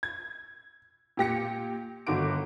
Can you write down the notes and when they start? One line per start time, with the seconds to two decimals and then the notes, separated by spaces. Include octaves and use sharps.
0.03 G#6
1.17 A#2 G4 A#6 C#7
2.07 G1 D3 D#3 F#4 D6 D7